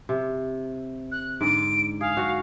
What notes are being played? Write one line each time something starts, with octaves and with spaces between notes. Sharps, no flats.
C3
F#6
G#2 D3 D7
G#4 F5
F#4